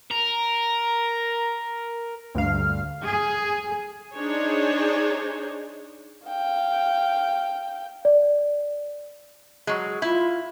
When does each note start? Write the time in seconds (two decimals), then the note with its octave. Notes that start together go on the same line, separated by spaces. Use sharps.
0.11 A#4
2.35 D2 G2 F5
3.04 G#4
4.14 D4 D#4 G#4 C5 C#5
6.27 F5 G5
8.05 D5
9.67 F#3 G#3
10.02 E4 F4